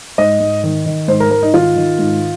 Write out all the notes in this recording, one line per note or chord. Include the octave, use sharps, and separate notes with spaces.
G#2 D#5
G#2
D#3
D#3
G#2 C5
A#4
G#2 A#4
D#4
D#3 F4
D#3
G#2